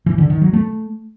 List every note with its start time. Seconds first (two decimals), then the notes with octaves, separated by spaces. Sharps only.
0.06 E3
0.18 D3
0.30 D#3
0.42 F#3
0.53 A3